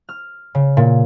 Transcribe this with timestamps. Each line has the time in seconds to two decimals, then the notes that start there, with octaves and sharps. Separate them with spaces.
0.09 F6
0.55 C#3
0.77 A#2